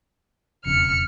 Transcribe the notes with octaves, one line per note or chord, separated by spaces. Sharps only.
E1 F2 C#3 F6 C#7